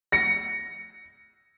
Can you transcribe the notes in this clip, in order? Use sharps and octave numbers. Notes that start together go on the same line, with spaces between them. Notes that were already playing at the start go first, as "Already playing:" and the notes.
A#6 C#7